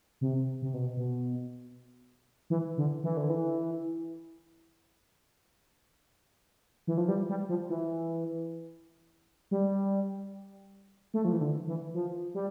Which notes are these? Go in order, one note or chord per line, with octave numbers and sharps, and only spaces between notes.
C3
C3
B2
B2
E3
D3
E3
D3
E3
E3
F3
G3
G3
F3
E3
G3
A3
F3
E3
D3
E3
F3
G3